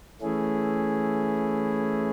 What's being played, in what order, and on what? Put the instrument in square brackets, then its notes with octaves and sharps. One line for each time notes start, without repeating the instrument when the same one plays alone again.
[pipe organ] E3 A3 C#4 E4 G#4